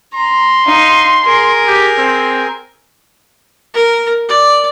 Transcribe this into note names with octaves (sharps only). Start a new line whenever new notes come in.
A#5 C6
D#4 F5
G#4 A#4
G4
C4
A#4
D5